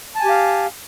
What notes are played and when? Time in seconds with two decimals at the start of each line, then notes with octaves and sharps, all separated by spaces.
0.15 A5
0.20 G#5
0.25 G4
0.30 F5